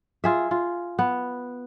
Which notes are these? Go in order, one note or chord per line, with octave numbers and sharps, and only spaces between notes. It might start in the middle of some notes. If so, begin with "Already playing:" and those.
F4 G#4 E5
F4
B3